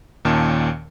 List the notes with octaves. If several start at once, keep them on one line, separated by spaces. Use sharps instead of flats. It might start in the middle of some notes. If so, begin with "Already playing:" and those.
D#2 A#2 D#3 C#4 A5